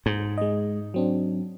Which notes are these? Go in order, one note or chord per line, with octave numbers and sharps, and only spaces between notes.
G#2
G#3 D#5
F#3 C4 D4